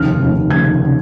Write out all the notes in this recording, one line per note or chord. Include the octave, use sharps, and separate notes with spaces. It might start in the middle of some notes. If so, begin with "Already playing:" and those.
Already playing: F1 D#2 C#3 F6
F1 D#2 C#3
F1 D#2 C#3 G#6
C#3